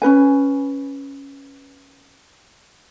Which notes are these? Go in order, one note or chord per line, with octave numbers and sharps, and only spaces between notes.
C#4 D#4 B4 G#5